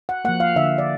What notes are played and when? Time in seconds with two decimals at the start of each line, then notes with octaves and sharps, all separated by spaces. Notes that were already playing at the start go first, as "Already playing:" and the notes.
0.09 F#5
0.25 F3 A#3 F#5
0.40 F5
0.56 D3 E5
0.78 D5